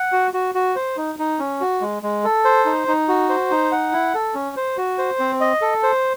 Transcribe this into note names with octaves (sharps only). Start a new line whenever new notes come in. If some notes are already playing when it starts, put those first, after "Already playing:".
Already playing: F#5
F#4
F#4
F#4
C5
D#4
D#4
C#4
F#4
G#3
G#3
A4
C5
D#4
D#4
F#4
C5
D#4
F#5
E4
A4
C#4
C5
F#4
C5
C4
D#5
A4
C5